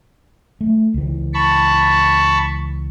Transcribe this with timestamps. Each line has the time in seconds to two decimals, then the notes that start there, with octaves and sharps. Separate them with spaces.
0.61 A3
0.94 C#2 E3
1.34 A5 B5 C#6